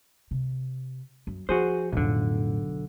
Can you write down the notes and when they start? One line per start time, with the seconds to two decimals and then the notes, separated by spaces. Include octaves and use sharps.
0.31 C3
1.27 F#2
1.49 F3 F#4 G#4 C5
1.92 B1 F2 A2 D3